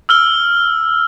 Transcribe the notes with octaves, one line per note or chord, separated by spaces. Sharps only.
E6 F6 G7